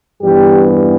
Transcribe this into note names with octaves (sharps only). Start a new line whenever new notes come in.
G2 E3 G3 B3 G4